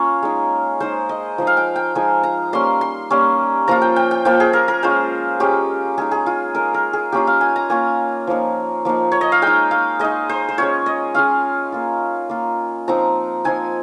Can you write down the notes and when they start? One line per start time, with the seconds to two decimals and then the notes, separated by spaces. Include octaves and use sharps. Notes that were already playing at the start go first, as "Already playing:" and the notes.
Already playing: A#3 C#4 F4 C#5 F5
0.23 G#3 D#4
0.80 G#3 D#4 C5
1.09 D#5
1.38 F3 G#3 D#4
1.47 F5
1.57 G5
1.76 G5
1.95 F3 G#3 D#4 G#5
2.23 A#5
2.52 G3 A#3 C#4 C6
2.81 C6
3.10 G3 A#3 C#4
3.68 F3 A#3 F4 A#5
3.82 G5
3.96 G5
4.11 G5
4.25 F3 A#3 F4 G5
4.40 G#4
4.53 A#4
4.68 A#4
4.83 G#3 C#4 F4 C5
5.40 G#3 C#4 F4 G4
5.98 G#3 D#4 G#4
6.11 G#4
6.26 F4
6.55 G#3 D#4 A#4
6.74 A#4
6.93 G#4
7.12 A#3 C#4 F4 G4
7.27 F5
7.41 G#5
7.56 A#5
7.70 A#3 C#4 F4 G#5
8.27 F3 A#3 D#4
8.85 F3 A#3 D#4
9.12 C#5
9.21 D#5
9.32 F5
9.42 G#3 D#4 G5
9.71 F5
9.99 G#3 D#4 D#5
10.29 C5
10.49 C5
10.58 G#3 C#4 F4 C#5
10.86 D#5
11.14 G#3 C#4 F4 F5
11.72 A#3 F4
12.29 A#3 F4
12.88 F3 C4 D#4 A#5
13.44 F3 C4 D#4 G#5